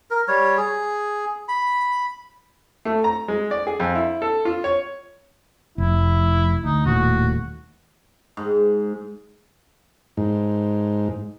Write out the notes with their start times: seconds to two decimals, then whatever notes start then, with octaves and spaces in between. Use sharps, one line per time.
0.10 A#4
0.28 G3 C#5
0.57 G#4
1.48 B5
2.85 A3
3.04 A#5
3.28 G#3
3.51 D5
3.67 G#4
3.80 F2
3.95 E4
4.22 A4
4.45 F4
4.64 C#5
5.78 F1 E4
6.65 D2 D#4
6.86 D#1 D#2 A2 F#4
8.37 G#2
10.17 G#2